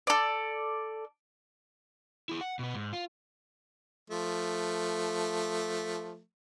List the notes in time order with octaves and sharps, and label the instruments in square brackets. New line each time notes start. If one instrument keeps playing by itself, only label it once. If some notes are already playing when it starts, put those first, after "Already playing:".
[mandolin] A4 D5
[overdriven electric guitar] E4 G#4
F#5
B2 B3
G#2
F4
[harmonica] F3 A3